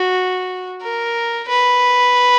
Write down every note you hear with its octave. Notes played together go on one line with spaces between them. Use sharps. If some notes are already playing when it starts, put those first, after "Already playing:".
Already playing: F#4
A#4
B4